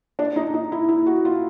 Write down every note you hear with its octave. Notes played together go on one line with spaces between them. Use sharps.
D4
D#4
D#4
E4
E4
F#4
F4